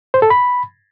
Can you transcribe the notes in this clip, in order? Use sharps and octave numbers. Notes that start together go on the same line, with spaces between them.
C5
A4
B5